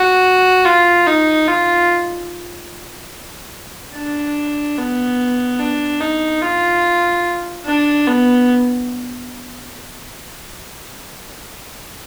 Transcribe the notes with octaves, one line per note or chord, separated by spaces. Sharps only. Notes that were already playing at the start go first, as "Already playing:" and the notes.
Already playing: F#4
F4
D#4
F4
D4
B3
D4
D#4
F4
D4
B3